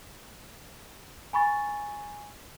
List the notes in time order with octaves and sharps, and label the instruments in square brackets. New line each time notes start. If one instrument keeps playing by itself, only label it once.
[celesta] G#5 B5 C#6 A6